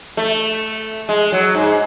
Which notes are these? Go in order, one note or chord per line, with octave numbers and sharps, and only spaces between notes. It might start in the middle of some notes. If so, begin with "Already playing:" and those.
A3
G#3
F#3
G#2